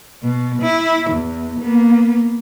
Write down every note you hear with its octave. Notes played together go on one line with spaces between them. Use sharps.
B2
E4
E2
A#3 B3